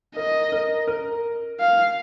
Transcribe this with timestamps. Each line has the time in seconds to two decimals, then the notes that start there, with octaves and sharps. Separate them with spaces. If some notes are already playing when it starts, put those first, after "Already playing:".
0.16 A#4 D#5
0.52 A#4
0.87 A#4
1.60 F5